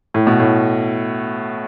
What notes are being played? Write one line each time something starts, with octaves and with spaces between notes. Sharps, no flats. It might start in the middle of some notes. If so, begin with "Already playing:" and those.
A2
B2
A2